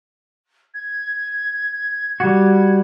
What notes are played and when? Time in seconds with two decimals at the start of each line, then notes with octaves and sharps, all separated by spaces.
0.74 G#6
2.20 G3 F#4